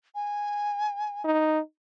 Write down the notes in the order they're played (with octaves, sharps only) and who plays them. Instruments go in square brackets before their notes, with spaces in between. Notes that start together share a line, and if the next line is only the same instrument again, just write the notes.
[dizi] G#5
[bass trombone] D#4